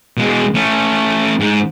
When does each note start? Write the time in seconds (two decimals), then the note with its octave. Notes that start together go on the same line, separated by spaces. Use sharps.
0.17 B2 G#3
0.55 A3 C#4
1.40 G#2